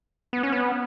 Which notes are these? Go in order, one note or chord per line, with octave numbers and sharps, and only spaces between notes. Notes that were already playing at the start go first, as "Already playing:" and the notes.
B3
C#4
B3